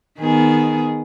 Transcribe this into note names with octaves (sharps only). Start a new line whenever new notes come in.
D#3 B3 G#4